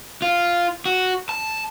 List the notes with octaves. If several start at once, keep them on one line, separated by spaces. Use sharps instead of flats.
F4
F#4
A5